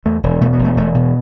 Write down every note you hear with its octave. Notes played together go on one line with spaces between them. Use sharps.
E2 A3
E1
B2 A3
B3
E1
A3
E1 A3
B2